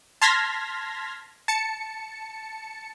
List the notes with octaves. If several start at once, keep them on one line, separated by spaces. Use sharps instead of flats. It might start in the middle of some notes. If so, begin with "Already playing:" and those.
A5 C6 F6 G#6 A#6 B6
A5 C#7